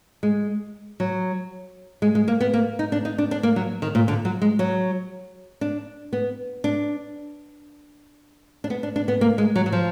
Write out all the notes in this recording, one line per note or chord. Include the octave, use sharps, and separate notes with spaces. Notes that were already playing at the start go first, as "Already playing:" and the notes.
G#3
F#3
G#3
G#3
A#3
B3
A#3
D#4
D4
D#4
D4
D4
A#3
F#3
D#3
A#2
D3
F#3
G#3
F#3
D4
B3
D4
D4
B3
D4
D4
B3
A#3
G#3
F#3
F#3
F3